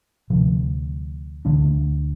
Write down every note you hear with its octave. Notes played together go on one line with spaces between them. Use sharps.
D2 C3 F3
D2 D3 G#3 D4